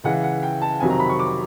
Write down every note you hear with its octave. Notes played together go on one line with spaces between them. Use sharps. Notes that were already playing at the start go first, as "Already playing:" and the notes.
C#2 C#3 E3 F#5
F#5
G5
A5
F2 C3 D#3 F#3 G#5
A#5
B5
C#6
D6